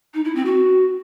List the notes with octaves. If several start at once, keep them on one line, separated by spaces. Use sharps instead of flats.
D#4
E4
C4
F#4